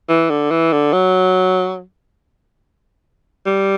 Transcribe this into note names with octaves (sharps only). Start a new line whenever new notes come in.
E3
D3
E3
D3
F#3
G3